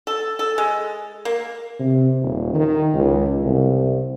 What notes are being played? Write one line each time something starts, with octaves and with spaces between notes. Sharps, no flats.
A4
A4
G#3
A#3
C3
D#1
D#3
C#2
C2